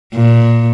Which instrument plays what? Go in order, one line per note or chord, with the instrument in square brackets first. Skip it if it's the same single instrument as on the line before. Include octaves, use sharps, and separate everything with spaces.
[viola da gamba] A#2